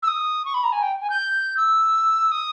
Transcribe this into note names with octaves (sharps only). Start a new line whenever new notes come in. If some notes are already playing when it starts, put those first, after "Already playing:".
E6
D#6
C#6
B5
A#5
G#5
G5
G#5
G6
E6
D#6